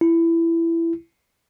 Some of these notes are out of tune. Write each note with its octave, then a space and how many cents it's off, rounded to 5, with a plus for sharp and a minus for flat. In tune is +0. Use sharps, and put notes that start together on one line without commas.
E4 +15